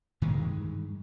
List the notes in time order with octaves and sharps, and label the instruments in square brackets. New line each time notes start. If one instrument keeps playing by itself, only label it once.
[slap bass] G2 D#3 E3 G#3